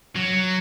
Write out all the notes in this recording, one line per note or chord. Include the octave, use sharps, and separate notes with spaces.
F#3